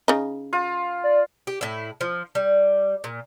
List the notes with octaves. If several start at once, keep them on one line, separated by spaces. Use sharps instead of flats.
C#3 D#4
F4
D5
G4
A2 E4
F3
G3
A#2